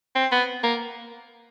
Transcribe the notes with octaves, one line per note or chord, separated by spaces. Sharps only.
C4
B3
A#3